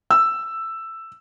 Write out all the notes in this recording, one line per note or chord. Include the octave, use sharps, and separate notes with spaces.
E6